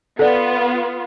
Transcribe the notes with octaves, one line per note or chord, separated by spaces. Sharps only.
B3 F4 A4 D5